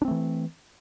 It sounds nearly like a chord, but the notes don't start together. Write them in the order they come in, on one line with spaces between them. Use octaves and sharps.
D4 C4 A3 E3